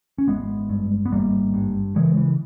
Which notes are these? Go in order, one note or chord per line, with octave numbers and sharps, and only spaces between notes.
C#4
G#1 G#3 B3
G2
B3
G#1 G3 A#3
G2
C#3 E3 G#3
E3